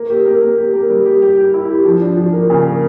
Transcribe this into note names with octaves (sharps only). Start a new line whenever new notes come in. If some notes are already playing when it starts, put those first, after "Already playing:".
Already playing: A#3
G4
A#3
A#3
G4
A#3
G3
G4
G4
G4
E4
G4
F3
D4
F3
A#3
C#3
A#3